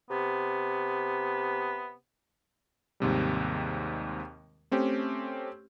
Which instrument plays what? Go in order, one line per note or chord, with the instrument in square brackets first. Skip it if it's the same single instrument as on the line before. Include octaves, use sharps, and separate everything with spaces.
[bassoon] C3 [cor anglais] B3
[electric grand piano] D#2 G#2 C3 G3
A3 C4 C#4 G4